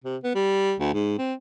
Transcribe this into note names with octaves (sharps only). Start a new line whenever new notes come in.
C3
B3
G3
D2
G#2
C4